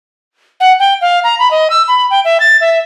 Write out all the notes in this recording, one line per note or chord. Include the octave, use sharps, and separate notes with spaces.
F#5
G5
F5
A#5
B5
D#5
E6
B5
G5
E5
A6
E5